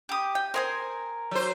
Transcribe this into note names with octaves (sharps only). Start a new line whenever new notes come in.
G4 D#6
G5
C4 G#4 A#4 C5 G#5
F#3 C5